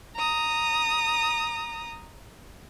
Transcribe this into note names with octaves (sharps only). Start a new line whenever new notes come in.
A#5 D#6